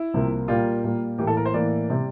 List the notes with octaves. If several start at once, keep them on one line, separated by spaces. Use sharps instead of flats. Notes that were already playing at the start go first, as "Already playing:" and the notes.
Already playing: E4
C2 C3 F3 A#3
A#2 G3 A#3 F4
A#2 G3 A#3
A2 E3 A#3 G4
A4
A#4
C5
A2 E3 A#3 D5
C3 G3